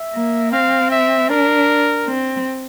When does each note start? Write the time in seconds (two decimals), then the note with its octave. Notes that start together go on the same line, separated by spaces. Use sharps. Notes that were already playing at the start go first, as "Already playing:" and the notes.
Already playing: E5
0.14 A#3
0.52 C4 F5
0.92 E5
1.29 D4 A#4
2.06 C4